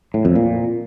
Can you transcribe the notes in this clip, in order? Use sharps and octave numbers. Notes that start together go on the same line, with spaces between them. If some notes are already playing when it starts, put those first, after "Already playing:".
A2
F2
A#2